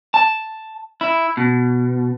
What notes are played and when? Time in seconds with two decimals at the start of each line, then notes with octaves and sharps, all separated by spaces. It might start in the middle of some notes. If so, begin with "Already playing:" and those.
0.14 A5
1.01 E4
1.37 B2